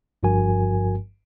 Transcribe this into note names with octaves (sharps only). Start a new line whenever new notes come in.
G1 G2 F3 F#4 A#4 G#5